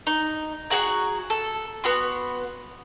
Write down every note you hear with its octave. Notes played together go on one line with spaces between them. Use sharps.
D#4
F#4 G#4 F#5 A#5
A4
B3 F#4 C6